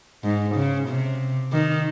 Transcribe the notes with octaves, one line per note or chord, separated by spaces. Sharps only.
G#2
C#3
C3
D#3